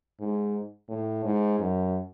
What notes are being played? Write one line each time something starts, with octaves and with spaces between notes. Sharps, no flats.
G#2
A2
G#2
F#2